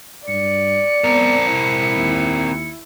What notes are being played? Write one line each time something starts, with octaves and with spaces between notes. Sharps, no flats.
G2 D5 C#7
B3 C4 A#4
C3 E4
D#2